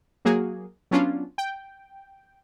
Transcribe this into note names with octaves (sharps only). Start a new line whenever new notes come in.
F#3 A#3 F#4 G#4
F#3 B3 C#4 D4 F4
G5